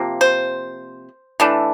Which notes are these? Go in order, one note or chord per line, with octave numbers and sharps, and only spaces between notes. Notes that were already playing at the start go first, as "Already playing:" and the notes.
Already playing: C3 F3 A#3
C5
E3 A3 D4